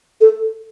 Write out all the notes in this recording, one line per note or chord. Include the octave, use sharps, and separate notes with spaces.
A4